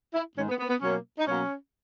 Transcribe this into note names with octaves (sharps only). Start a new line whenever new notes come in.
E4
G#2 D#3 G#3 C#4
B3
B3
B3
B2 F#3 A#3 C#4
D#4
B2 F#3 A#3 C#4